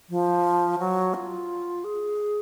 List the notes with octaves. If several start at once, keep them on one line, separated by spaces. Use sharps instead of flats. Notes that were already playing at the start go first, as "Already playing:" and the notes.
F3
F#3
F4
G#4